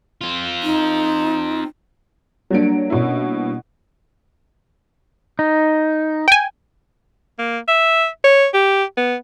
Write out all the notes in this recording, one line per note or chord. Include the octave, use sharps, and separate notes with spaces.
C4 F4
D#4
F#3 G3 A#3 D4 D7
B2 C#4 E4
D#4
G5 G#5
A#3
E5
C#5
G4
B3